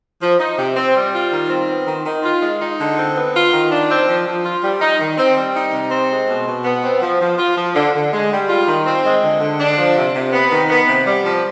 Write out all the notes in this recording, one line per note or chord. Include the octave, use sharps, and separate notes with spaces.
F3
D#4
C3
C4
G3
F4
D#3
C4
B3
D#3
D#3
F4
G#3
D#4
D3
C4
B3
F4
D#3
D4
C4
F3
F3
F4
G3
D#4
D#3
C4
G3
D#4
C3
C4
G#3
B2
B2
B3
C4
F3
F3
F4
F3
D3
D3
G#3
G3
F4
D#3
C4
G#3
D3
D3
D4
F3
C3
C3
B3
D#3
B3
C3
G3
F3